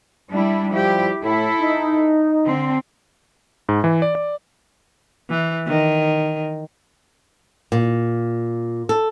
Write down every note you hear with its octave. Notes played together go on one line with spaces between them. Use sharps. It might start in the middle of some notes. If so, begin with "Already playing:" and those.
G3 D4 E4
F3 G3 E4 G4
A2 E4 A4
D#4
D3 C4
G#2
E3
D5
D5
E3
D#3
A#2
A4